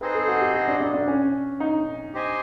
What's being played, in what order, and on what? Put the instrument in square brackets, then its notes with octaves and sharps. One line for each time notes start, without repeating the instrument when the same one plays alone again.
[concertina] C4 D#4 G#4 C5 D#5 [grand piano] B4
[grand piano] A4
F#4
G4
F#4
D4
D4
D4
C#4
D#4
[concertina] G4 C5 D#5 G#5